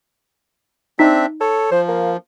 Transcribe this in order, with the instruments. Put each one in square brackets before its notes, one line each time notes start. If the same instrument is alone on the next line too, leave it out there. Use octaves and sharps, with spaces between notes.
[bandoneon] C4 D4 E5 [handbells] D#4 B6
[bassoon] A4 [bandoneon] C#5
[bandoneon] F3 [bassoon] C5
[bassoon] A#3